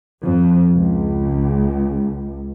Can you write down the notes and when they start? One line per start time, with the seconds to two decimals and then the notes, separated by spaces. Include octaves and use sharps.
0.23 F2
0.76 C#2